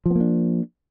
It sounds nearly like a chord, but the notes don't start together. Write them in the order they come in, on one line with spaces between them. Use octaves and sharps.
F3 B3 A#3 D4